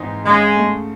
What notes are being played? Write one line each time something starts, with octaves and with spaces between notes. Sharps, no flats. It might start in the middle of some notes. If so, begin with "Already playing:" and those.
Already playing: G#2 E3 C4 D#4
C#3 G#3
A3